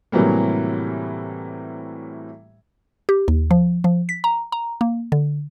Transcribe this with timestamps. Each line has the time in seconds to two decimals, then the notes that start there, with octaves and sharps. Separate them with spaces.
0.12 A2 C3 E3 F#3 G3 A#3
3.09 G4
3.28 D#2
3.51 F3
3.84 F3
4.09 B6
4.24 A#5
4.52 A#5
4.81 A#3
5.12 D3